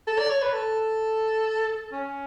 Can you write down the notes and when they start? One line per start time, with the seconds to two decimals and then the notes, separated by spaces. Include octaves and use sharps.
0.07 A4
0.19 D5
0.30 C#5
0.42 B4
0.53 A4
1.92 C#4